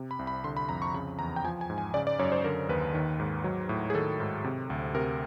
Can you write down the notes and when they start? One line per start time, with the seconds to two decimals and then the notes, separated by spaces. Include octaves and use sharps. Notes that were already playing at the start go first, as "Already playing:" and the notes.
Already playing: C3
0.11 B5
0.19 C2
0.27 B5
0.44 D3 C6
0.57 B5
0.69 F2 A#5
0.82 C#6
0.94 C#3 B5
1.19 E2 A#5
1.36 G5
1.45 F3 G#5
1.61 G#5
1.70 G#2
1.78 G#5
1.94 C#3 D5
2.07 D5
2.19 F#2 C#5
2.32 C5
2.44 D3 A#4
2.69 D#2 B4
2.94 D#3
3.20 G#2
3.44 F#3
3.69 A2
3.90 G#4
3.94 D#3 A4
4.20 G#2
4.44 C3
4.70 D2
4.95 C3 A#4